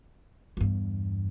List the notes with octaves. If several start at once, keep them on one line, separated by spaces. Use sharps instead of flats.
E2 G2